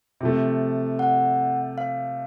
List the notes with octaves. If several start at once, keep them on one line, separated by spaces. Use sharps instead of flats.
C3 F3 A3
F#5
F5